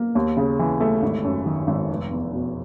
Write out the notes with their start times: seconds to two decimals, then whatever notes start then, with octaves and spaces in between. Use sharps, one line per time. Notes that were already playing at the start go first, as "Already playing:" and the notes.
Already playing: A#3
0.15 D#2
0.37 C#3
0.59 E3
0.80 A3
1.02 G#1
1.24 F#2
1.46 D#3
1.67 G#1
1.90 F1
2.11 E2
2.33 B2